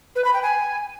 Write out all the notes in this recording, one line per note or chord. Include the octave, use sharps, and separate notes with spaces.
B4
B5
G5
G#5